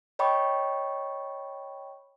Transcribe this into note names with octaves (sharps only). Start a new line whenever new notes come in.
C#5 D#5 G5 B5 C#6 D6